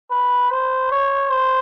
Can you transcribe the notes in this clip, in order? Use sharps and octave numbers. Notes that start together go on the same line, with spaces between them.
B4
C5
C#5
C5